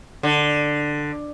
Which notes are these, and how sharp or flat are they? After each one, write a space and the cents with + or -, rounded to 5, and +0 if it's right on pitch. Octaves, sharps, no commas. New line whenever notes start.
D3 +10